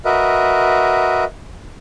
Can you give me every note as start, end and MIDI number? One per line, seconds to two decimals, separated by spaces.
0.05 1.24 66
0.05 1.24 70
0.05 1.24 71
0.05 1.24 75
0.05 1.24 76